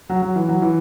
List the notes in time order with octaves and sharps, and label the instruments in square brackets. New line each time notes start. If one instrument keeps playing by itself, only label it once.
[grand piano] F#3
F#3
E3
F#3
E3